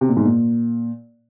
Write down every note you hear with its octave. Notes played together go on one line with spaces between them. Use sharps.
C3
A#2
G#2
A#2